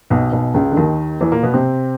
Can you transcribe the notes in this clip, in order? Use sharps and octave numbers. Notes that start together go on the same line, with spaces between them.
B1 B2
B1 B2
C#2 C#3
D3
D#2 D#3
E2 E3
A#2 A#3
B2 B3
C3 C4